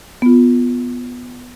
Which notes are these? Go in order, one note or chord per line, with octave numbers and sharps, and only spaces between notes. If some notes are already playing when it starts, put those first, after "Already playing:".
B3 F4